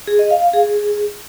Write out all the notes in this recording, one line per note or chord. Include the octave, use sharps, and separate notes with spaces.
G#4
D#5
F5
F5
G#4